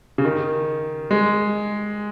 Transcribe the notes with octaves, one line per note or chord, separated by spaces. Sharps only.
C#3
D#3
G#3